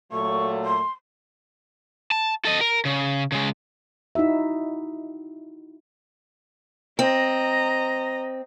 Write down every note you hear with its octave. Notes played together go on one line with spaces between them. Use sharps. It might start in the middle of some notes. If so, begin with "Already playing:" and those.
A#2 F#3 A3 C#6
C6
A5
A4 D#5
A#4
C#3
C#3 G#3
D#4 E4 F#4 E5
C4 D#5 A#5